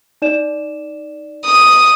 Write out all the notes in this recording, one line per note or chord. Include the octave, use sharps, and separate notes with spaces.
D#4 D5 E7
D#6